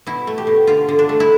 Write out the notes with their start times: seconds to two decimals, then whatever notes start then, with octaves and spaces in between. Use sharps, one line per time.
0.06 B2 E4
0.27 A3
0.38 G4
0.47 B2
0.67 D3 F4
0.89 D3
0.99 D4
1.09 A3
1.20 E4